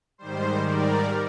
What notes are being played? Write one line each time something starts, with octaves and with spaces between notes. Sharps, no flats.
G#2 D#3 G3 C5
A#4 D5